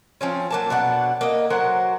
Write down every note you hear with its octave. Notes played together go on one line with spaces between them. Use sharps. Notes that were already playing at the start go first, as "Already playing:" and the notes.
F3 C4 C#4
F#3 A#3 A5
B2 D4 F#5
A#3 D#5
F#3 A#4 C5 F#5